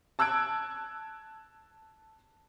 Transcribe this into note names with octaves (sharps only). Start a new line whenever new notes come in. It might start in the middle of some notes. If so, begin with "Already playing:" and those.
A5 E6 F#6 G#6 D7